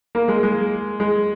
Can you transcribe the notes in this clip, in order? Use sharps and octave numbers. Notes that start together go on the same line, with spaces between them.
A#3
G#3
G#3
G#3